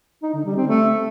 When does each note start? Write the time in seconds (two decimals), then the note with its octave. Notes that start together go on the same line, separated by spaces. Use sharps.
0.23 D#4
0.34 D3
0.45 G3
0.56 C4
0.68 A3